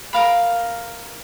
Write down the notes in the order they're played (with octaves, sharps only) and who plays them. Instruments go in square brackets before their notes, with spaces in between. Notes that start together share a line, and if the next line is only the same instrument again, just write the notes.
[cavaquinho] A#4 F5 B5